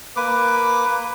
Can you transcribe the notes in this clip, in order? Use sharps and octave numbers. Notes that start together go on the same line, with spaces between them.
A#3 B4 D6